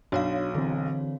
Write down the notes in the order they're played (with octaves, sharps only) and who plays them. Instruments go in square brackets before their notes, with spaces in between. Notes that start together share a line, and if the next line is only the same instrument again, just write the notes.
[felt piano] B1 [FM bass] D4 [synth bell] F#4 C#5 F5
[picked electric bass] D3 C4 [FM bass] E3